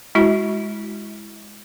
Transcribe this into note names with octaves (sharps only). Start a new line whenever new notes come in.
G#3 E4 F#4